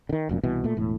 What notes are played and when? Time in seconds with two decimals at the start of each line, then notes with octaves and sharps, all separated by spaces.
0.09 D3 D#3
0.29 F1 F#2 A#2
0.43 C2 B2 E3
0.64 A#2 A3
0.77 E1 A2